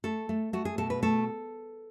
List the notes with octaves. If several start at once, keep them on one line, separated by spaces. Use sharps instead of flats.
A3 A4
A3
A3 F#4
G#4
B2 A4
B4
A3 A4